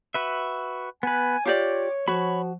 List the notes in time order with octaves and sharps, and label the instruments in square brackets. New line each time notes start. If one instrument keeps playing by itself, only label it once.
[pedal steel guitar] F#4 B4 E5
[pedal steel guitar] B3 B4 [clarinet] G#5
[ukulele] F4 G4 D5 [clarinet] C#5 [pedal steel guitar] D6
[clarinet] F3 [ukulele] F#4 [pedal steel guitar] C#5 B5